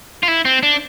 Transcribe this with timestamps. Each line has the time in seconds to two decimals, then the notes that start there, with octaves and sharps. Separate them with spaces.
0.23 F4
0.28 E4
0.45 C4
0.63 D4